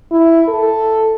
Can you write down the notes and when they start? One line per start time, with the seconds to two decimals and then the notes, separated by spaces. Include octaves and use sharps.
0.12 E4
0.48 A4